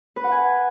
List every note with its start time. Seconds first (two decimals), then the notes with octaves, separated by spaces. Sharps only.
0.16 B4
0.24 F#5
0.32 G#5